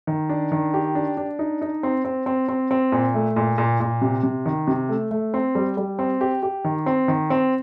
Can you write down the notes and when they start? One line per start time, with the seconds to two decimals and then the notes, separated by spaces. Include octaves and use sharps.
0.07 D#3
0.29 D4
0.52 D#3
0.74 G4
0.95 D4
1.17 D4
1.39 D#4
1.62 D#4
1.83 C4
2.05 C4
2.26 C4
2.48 C4
2.71 C4
2.92 A#2
3.14 A3
3.36 A#2
3.58 A#2
3.80 A#2
4.02 C3
4.23 C3
4.46 D#3
4.67 C3
4.89 A3
5.11 A3
5.34 C4
5.55 G3
5.77 G3
5.99 C4
6.21 G4
6.43 G4
6.64 D#3
6.86 C4
7.08 D#3
7.30 C4